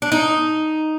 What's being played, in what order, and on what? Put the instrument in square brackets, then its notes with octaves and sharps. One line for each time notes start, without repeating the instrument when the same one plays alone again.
[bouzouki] D4
D#4